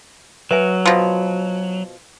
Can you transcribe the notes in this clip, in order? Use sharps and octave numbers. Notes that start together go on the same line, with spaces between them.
F#3 B4 E5 G#5
B2 F3